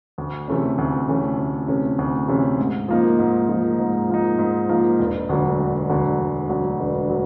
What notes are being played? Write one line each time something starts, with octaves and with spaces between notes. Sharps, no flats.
D2
C3 E3 A3 C#4
D2
C3 E3 A3 C#4
D2
C3 E3 A3 C#4
D2
C3 E3 A3 C#4
G#2
F3 A#3 D#4
G#2
F3 A#3 D#4
G#2
F3 A#3 D#4
G#2
F3 A#3 D#4
E1
D2 D3 F#3
E1
D2 D3 F#3
E1
D2 D3 F#3
E1
D3 F#3